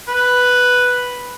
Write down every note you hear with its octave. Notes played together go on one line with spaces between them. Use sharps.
B4